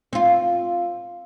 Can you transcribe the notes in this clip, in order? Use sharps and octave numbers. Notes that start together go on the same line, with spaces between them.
C4 F4